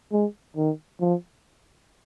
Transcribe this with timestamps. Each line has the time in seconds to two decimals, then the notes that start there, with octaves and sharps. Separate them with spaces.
0.12 G#3
0.57 D#3
1.01 F3